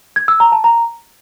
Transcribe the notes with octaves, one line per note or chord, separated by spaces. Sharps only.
G#6
E6
A#5
A5
A#5